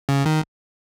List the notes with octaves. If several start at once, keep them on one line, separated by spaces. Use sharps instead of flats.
C#3
D#3